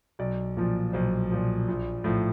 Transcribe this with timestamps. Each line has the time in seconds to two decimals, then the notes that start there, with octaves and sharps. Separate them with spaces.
0.19 B1 D5
0.57 A#2 F3
0.93 B1 C5
1.31 A#2 F3
1.68 A#1
2.04 A2 F3